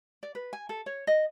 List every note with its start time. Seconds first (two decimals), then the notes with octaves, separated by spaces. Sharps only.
0.23 D5
0.35 B4
0.53 G#5
0.69 A4
0.86 C#5
1.07 D#5